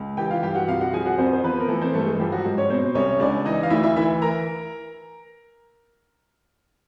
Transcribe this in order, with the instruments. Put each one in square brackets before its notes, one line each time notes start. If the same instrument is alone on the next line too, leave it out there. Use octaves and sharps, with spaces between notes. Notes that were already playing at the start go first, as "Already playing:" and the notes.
Already playing: [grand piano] C#2
E3 G4 G5
F4 F5
G2 G4 G5
F#4 F#5
C2 F4 F5
F#4 F#5
F3 G#4 G#5
F#4 F#5
F2 C4 C5
C5
F3 B3 B4
A#4
E3 A3 A4
C4 C5
G2 A3 A4
G#3 G#4
F3 G3 G4
F#3 F#4
G#2
C#4 C#5
B2 C4 C5
C2 C#4 C#5
C#2 D4 D5
E3 D#4 D#5
F5
D2 E4 E5
E4 E5
E3 E4 E5
A#4 A#5